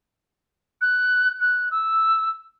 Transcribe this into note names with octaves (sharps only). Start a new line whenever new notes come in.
F#6
F#6
E6